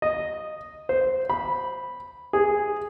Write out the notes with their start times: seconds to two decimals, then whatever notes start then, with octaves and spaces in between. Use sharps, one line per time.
0.02 D#5
0.89 C5
1.30 B5
2.33 G#4